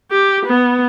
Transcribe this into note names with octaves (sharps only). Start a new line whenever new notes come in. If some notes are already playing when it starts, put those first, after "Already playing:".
G4
B3